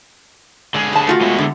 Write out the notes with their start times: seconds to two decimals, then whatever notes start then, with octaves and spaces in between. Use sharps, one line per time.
0.74 D3 G#3 G#4
0.93 G3 A5
1.07 A3 F4 F#4
1.21 G#3 B3 E4
1.38 D3